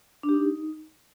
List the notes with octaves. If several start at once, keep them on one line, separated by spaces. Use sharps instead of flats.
D4
G4
D#4